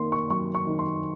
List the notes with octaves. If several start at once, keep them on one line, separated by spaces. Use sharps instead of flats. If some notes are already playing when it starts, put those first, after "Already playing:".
Already playing: D#3 A#3 C6
C#6
F#3 C#6
C#6
D#3
C6